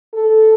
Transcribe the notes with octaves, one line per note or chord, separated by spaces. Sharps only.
A4